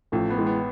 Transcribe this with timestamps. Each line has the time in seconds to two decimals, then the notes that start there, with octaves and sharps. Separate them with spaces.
0.12 A1 F3 A3
0.30 B3
0.38 E3 G#3
0.46 B3